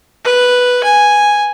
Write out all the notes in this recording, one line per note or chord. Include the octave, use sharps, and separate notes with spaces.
B4
G#5